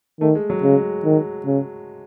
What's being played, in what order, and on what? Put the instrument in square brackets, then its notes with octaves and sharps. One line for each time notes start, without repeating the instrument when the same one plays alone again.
[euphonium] D#3 [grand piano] A3
[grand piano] G#3
F#3
[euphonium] C#3 [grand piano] G#3
[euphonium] D#3
C#3